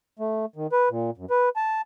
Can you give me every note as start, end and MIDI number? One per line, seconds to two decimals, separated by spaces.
0.19 0.46 57
0.56 0.67 51
0.72 0.89 71
0.90 1.11 46
1.18 1.25 42
1.30 1.49 71
1.56 1.81 81